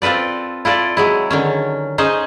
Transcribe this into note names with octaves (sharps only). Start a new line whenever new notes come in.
C4 F4 A4 B4 D5
E4 F4 A4 D5
F#3 G#3 E4
D3 D#3 C#4
C#4 D#4 G#4 C5 D#5